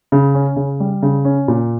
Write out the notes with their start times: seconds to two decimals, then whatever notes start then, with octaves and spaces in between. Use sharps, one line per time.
0.12 C#3
0.34 C#4
0.56 C#3
0.80 G3
1.02 C#3
1.25 C#4
1.48 A#2